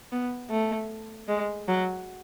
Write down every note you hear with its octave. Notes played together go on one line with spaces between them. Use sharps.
B3
A3
G#3
F#3